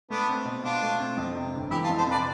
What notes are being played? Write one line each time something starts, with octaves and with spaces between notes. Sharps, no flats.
A3 B3 D4
C4
B2
B2 D4 F4
A3
C4
F2
C3
G1
E3 E4 G4
F4 A4
F2
A4 C5
C3 B4 D5